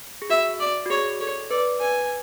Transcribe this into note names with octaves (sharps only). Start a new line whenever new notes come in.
G#4
F#4 E5
D5
F#4
G#4 C#5
A4 C#5
B4 D5
B4 G#5